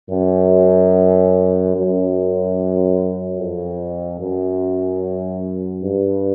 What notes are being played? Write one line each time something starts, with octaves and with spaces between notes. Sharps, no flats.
F#2
F#2
F2
F#2
G2